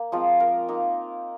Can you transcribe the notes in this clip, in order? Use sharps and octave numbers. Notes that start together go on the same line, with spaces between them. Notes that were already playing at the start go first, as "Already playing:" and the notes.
Already playing: A#3
F3 G#3 C4 F4
A#4
A#3 D#4